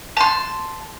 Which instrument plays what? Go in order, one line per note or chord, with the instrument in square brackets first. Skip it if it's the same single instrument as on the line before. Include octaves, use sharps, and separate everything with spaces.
[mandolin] A5 C6